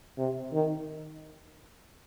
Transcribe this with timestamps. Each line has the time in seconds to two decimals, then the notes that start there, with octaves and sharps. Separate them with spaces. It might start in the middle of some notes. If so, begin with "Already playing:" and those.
0.18 C3
0.53 D#3